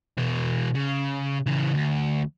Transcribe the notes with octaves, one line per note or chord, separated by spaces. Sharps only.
B2 E3
C#3
C#3 E3
D2